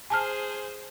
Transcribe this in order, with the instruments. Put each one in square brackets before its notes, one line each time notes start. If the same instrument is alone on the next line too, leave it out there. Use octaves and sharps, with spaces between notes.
[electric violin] G#4 C5 [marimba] G#5 A5 F6